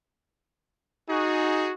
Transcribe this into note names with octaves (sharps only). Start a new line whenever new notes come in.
D#4 F#4 G#4